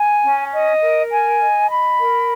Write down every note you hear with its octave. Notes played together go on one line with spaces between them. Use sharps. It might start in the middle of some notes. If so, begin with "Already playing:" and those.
Already playing: G#5
C#4
D#5
A#4
G#5
D#5
B5
A#4